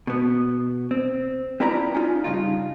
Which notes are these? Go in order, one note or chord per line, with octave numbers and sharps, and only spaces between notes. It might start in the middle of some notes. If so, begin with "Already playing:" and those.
B2 B3
C4
C4 E4 F4 B4 D5 A#5
C#4 D#4 F4
G2 A#2 C#3 D#4 F4